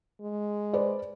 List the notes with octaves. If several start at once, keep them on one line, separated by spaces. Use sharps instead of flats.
G#3
B4 C5 D5